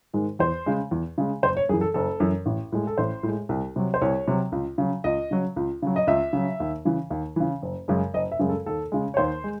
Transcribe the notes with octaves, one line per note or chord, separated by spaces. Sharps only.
G#2 D#3 G#3
E2 C5
C#3 G#3
E2
C#3 G#3
F#1 C5
C#5
F#2 E3 G#4
A4
F#1 A4
F#2 E3
A1
A2 G#3
A4
A1 C5
A2 G#3
C2
C3 F#3
C5
C2 C#5
C3 F#3
C#2
C#3 F#3
C#2 D#5
C#3 F#3
C#2
C#3 F#3
D#5
C#2 E5
C#3 F#3
D#2
C#3 E3
D#2
C#3 E3
F#1
F#2 C#3 G#3
F#1 D#5
E5
F#2 C#3 G#3
A4
D#2 A4
C#3 G#3
C#5
D#2 C5
G#3